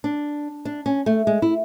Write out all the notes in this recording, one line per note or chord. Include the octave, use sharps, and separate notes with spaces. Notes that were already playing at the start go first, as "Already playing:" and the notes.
D4
D4
C#4
A3
G#3
E4